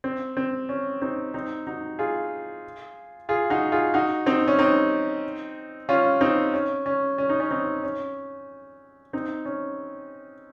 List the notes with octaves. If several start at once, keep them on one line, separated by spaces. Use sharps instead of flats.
C4
C4
C#4
C4 D#4
C4 D#4
D#4 F#4
F4 G#4
F4 G#4
D#4 F#4
F4 G#4
D#4 F#4
C4 D#4
C#4
C4 D#4
C#4 F4
C4 D#4
C#4
C#4
C#4
D#4
C#4
C4 D#4
C#4
C4 D#4
C#4